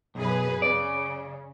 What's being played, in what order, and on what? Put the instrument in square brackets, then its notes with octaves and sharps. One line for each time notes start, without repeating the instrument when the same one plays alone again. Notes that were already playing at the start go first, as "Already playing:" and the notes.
[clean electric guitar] B1 [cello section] F#2 G#4 B4
[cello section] C#3 [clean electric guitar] D5